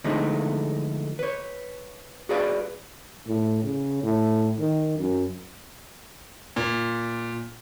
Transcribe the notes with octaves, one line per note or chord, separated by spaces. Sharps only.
D3 E3 F3 G#3 A3 D#4
B4 C#5
F#4 G#4 B4 D5 F5
A2
C#3
A2
D#3
F#2
A#2